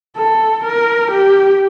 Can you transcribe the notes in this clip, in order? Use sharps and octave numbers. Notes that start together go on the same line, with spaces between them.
A4
A#4
G4